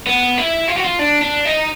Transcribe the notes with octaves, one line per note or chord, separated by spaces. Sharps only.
B3
E4
F4
F#4
F4
D4
D4
D#4